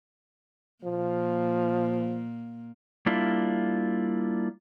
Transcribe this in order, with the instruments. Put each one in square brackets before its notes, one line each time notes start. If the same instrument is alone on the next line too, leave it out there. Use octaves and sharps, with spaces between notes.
[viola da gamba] A#2 A#3 [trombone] F3
[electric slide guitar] G3 A#3 D4 E4 F4